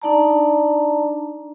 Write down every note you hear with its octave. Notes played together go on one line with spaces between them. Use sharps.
D4 D#4 D5 A5 A#5